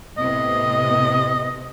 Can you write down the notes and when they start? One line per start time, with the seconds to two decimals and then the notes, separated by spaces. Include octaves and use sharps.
0.18 A2 C3 B3 D#5